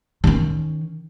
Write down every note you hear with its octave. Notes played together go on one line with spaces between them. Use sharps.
D#3 C#4